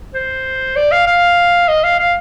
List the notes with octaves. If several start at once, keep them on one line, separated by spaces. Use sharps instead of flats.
C5
D5
F5
F5
D#5
F5
F5